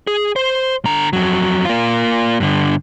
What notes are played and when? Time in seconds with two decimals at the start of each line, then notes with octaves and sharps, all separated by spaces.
0.07 G#4
0.36 C5
0.85 D3 A#5
1.13 F2 F#3
1.65 A#3 F4
2.40 G2 D3